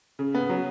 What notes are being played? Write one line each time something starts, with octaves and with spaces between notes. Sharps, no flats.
C#3
B3
F#3